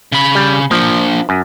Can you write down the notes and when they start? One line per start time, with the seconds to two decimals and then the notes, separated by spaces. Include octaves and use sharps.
0.12 C#3 B5
0.35 G3
0.71 F3 A#3 D4
1.29 F#2